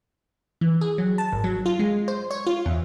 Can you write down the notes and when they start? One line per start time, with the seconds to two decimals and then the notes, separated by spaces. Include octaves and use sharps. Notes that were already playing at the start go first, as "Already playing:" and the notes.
0.61 E3
0.81 G#4
0.98 F#3
1.18 A5
1.32 G#1
1.44 F#3
1.66 F4
1.79 G#3
2.08 C5
2.31 C#5
2.47 F4
2.66 E2